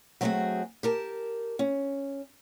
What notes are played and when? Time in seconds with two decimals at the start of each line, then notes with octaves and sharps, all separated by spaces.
0.21 F#3 A3 C4 F4 F#4 G#4
0.83 G4 A#4 A5
1.59 C#4